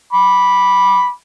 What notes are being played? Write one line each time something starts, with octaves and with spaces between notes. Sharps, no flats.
B5 D6